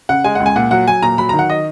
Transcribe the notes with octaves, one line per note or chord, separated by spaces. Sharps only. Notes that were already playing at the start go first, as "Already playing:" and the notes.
C#3 F#5
G#3 G#5
F#5
C#2
G#5
A#2 F#5
F#3 F#5
F#3 G#5
A#2 A#5
F#3 B5
D#3 A#5
F#5
D#5